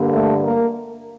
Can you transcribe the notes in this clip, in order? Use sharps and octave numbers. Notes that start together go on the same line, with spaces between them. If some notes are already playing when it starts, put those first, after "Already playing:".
Already playing: G2 D3 G3 A#3
A3 A4
A#3 A#4